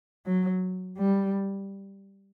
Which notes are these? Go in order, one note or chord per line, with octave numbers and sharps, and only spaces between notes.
F#3
G3